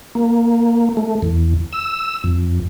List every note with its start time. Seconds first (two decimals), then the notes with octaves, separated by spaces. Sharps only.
0.15 A#3
0.97 A3
1.22 E2
1.73 E6
2.24 F2